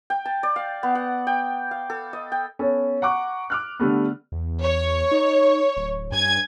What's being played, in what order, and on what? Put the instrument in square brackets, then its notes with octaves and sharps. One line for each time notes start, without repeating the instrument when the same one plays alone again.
[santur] G5
A5
D5
F5
B3
F#5
G5
F5
A4
D#5
G5
[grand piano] B3 C#4 A4
F#5 A#5 C#6 D6 F#6
D6 F6 F#6
D3 G3 A3 B3
[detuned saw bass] E2
[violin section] C#5
[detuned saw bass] D#4
D1
[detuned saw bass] G2 [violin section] G#5 G#6